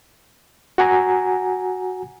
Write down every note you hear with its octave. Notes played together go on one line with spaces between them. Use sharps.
F#4 F#5 G#5 A#5